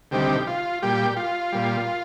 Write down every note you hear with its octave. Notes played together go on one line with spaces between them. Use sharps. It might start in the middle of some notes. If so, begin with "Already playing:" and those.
D2 C3 D#3 G3 G4
F4
A#2 G3 G4
F4
A#2 G3